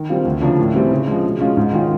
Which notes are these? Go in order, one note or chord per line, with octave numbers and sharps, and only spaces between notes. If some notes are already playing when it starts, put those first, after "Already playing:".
Already playing: D#3
G3 C4 F4
D2
C#3 F3 A#3 D4
A2
E3 G3 C4
C#3
F3 G#3
B2
G#3 C#4 F4
G#2
D#3 G#3 C#4 F4